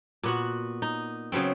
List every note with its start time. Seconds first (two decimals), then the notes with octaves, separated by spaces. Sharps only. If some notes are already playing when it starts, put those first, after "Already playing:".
0.23 A#2 B3 F#4
0.82 D#4
1.32 C#3 F#3 B3 C4